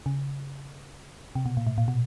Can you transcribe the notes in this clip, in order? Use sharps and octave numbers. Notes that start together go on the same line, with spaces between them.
C#3
C3
B2
A#2
A2
A#2
B2